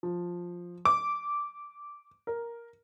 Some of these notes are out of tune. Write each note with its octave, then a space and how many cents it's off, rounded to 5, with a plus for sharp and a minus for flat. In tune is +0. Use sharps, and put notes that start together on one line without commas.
F3 +5
D6 -10
A#4 +5